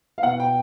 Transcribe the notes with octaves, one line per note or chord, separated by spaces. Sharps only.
F5
B2 F#5
G5